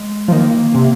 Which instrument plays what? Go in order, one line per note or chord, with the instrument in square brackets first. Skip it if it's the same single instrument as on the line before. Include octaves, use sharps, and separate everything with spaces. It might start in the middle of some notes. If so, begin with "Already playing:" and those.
Already playing: [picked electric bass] G#3
[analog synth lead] F3
[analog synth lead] D#3 [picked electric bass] A#3
[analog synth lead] C3